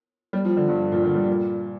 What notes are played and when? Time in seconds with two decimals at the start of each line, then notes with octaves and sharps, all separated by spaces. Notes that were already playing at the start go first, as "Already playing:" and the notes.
0.33 G3
0.45 F3
0.57 D3
0.68 G2
0.92 A#2
1.04 D3
1.15 G3
1.28 A#2